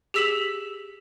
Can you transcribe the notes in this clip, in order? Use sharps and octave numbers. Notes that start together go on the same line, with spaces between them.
G4 G#4 E6 B6 E7 F#7